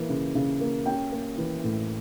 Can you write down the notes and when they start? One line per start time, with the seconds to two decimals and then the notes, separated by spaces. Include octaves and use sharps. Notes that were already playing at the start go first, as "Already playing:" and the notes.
Already playing: E3 A#3
0.09 C#3
0.35 C#3
0.61 A#3
0.86 C#4 G5
1.12 A#3
1.38 E3
1.64 A2